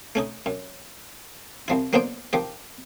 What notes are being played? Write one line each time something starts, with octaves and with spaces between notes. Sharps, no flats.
A3 C#4 D#4
F#2
C2 F3 E4
F#3 A#3 B3 D4 C5 D5
D#3 F3 G4